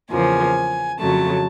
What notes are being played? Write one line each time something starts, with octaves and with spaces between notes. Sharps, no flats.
E2 C#3 F3 A#3 G#5
F2 C#3 F#3 A3 A5